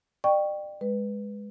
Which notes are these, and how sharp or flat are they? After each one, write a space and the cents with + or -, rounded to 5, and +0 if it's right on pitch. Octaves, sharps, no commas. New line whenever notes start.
D5 +40 G5 +0 C#6 +0
G#3 -10 B4 +0